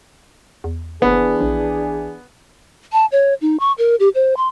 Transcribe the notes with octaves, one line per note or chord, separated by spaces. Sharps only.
E2
F#1 E3 B3 D4 G#4
A#1
A5
C#5
D#4
C#6
A#4
G4
C5
C6